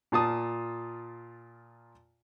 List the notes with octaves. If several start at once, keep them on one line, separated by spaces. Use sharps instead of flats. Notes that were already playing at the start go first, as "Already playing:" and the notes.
A#2 F4 A5 D#6